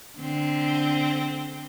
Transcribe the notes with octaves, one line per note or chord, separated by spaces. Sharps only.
D3 C4